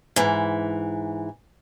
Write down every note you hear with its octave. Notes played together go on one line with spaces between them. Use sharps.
G#2 E3